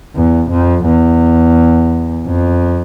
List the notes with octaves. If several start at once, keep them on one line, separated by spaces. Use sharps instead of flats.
E2
F2
E2
F2